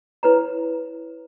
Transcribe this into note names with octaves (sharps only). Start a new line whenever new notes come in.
E4 B4 C#5 A#5